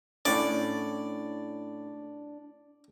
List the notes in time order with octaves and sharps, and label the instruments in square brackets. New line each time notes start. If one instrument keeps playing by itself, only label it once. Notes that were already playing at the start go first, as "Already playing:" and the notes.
[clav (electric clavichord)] A2 C#4 [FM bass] D4 [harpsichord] D5